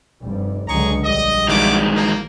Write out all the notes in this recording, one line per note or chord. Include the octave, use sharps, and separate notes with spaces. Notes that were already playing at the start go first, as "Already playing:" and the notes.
F1 G2 G3
C#2 D3 F#3 G#4 A#5 C#6
A#1 G3 D#5
D#3 E3 G#3 E4 F#4 D6
A#3